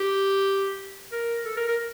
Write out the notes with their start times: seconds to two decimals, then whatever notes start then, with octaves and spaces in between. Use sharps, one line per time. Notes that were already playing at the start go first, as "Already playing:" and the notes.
Already playing: G4
1.12 A#4
1.45 A4
1.56 A#4
1.68 A#4